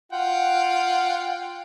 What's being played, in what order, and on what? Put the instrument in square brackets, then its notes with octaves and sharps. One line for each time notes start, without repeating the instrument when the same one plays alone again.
[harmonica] F4 G5 [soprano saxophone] F#5